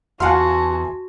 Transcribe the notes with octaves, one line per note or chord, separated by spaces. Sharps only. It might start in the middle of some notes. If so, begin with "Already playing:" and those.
E2 F#4 F5 F#5 G#5 A5 C6